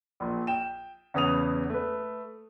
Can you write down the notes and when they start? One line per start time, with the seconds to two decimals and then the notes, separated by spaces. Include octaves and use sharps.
0.20 A#1 A#2
0.47 G5 E7
1.14 E2 C#3 B3 D#6 F7
1.70 A3 B4